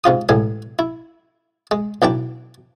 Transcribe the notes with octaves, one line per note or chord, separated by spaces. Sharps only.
G#2 C3 F4 D#6
A1 A2 G#3 G#5
E4
G#3
B1 E3 D4 G5